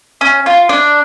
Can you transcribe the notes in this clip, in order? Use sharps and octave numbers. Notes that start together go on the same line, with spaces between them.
C#4
F4
D4